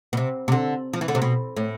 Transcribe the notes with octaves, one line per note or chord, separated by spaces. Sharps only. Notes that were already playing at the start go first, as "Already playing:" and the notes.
B2
C3
C3
D3
F3
E3
D3
C3
B2
A2